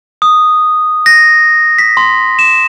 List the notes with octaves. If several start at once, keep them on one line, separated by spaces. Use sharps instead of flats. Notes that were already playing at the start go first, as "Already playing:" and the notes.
D#6
A#6
B6
C6
E7